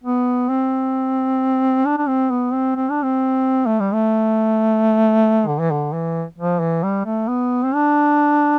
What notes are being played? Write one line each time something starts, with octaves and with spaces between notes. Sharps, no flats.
B3
C4
D4
D4
C4
B3
C4
C4
D4
C4
A3
G3
A3
D3
E3
D3
E3
F3
E3
G3
A3
B3
C4
D4